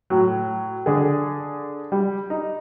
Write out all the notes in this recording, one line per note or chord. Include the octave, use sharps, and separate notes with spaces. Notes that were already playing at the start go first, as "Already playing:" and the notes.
A2 F#3
D3 G#4
G3
D#4